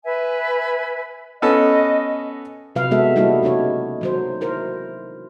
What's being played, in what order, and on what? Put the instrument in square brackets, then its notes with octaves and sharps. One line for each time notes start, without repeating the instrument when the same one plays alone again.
[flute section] B4 E5 G#5
[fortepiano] B3 C#4 A4 [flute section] D#5
[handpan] C3 F#3 B4 F5
G#3 B3 F#4 A4 E5
G3 A#3 D#4 E4 F#4 A4
C#3 F#3 D#4 C#5
D#3 F#3 C5
E4 A#4 C5